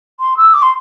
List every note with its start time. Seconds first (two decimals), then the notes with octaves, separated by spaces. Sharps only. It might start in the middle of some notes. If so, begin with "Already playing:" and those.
0.20 C6
0.37 E6
0.53 D6
0.62 C6